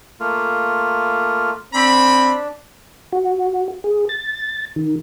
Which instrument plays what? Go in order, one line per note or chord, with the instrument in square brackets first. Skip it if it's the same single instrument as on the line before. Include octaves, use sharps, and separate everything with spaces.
[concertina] A3 A#3 F4
[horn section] C4 B5 [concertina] D4
[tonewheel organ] F#4
G#4
A6
D#3